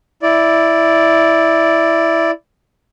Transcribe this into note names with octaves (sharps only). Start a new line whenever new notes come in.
E4 D5